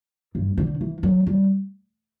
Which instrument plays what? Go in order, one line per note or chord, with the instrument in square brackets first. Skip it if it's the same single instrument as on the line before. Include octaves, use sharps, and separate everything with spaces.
[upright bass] G2
D3
E3
F#3
G3